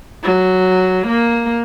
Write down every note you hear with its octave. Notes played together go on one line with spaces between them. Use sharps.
F#3
A#3